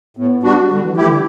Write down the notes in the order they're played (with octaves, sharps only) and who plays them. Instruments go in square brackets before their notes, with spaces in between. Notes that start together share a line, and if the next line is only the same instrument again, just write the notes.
[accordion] A2 [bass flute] B3
[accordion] G3 D4 F#4
[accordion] D3 [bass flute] G3
[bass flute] E3
[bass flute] E3 [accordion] A3 E4 G4
[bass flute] D3